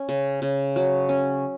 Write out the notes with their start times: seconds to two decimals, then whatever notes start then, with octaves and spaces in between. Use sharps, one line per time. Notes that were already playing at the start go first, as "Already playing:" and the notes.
Already playing: C#4
0.09 C#3
0.42 C#3
0.76 F#3
1.09 C#4